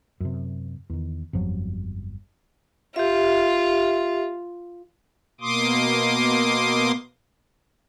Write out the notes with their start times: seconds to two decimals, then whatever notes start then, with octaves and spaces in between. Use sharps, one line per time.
0.20 F#2 C3
0.90 E2 D#3
1.33 G1 F2 F3 F#3
2.96 F4 G4 E5
5.41 B2 A#3 C6 D6 D#6